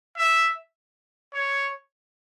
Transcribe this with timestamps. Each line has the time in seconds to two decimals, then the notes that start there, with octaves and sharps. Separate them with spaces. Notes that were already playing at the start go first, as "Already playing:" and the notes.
0.17 E5
1.34 C#5